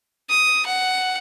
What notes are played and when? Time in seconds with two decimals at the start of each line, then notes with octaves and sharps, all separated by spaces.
0.30 D#6
0.66 F#5